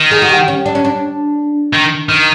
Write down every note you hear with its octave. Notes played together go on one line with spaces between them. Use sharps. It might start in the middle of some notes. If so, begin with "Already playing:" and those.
Already playing: D#3
G#4
F#4
G4
C#4
D4
C#4
D4
D#3
D#3